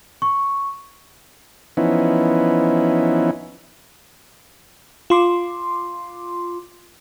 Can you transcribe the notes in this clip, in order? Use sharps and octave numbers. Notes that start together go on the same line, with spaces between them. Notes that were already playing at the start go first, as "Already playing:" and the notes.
C#6
E3 F3 B3 C#4 D#4 E4
F4 C6 D6